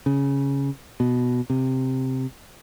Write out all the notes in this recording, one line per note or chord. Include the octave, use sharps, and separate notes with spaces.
C#3
B2
C3